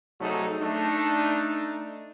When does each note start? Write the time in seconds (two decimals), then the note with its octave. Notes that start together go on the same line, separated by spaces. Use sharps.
0.20 C2 F#3 A3 D#4 G#4 A4
0.61 A3 D4 D#4